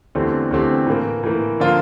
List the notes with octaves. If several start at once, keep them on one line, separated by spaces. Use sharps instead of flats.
E2 D3 A3 C4 G4
E2 D3 A3 C4 G4
A2 E3 A#3
A2 E3 A#3
D3 F3 A#3 F4